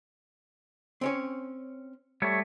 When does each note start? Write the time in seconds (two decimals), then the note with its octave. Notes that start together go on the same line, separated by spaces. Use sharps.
1.01 C4 C#4 C#5
2.22 G3 A3 C#5